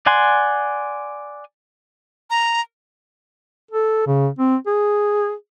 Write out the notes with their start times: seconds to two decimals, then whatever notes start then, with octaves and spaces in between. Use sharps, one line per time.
0.06 D5 F#5 G#5 C6
2.30 A#5
3.71 A4
4.07 C#3
4.39 C4
4.67 G#4